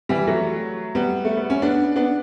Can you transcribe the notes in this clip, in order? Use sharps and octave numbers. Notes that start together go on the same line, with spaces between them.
E3 G3
F#3 A3
G3 B3
A3
B3
C#4
B3 D4
B3 D4